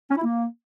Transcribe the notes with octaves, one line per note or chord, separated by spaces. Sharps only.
C#4
E4
A#3